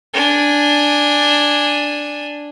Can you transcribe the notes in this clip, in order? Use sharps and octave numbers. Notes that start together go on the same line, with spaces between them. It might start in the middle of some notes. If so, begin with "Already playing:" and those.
D4 G#5